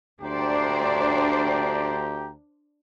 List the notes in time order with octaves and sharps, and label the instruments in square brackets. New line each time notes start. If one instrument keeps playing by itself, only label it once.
[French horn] D2 [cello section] D4 C5 D5 [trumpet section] G4 G5 A#5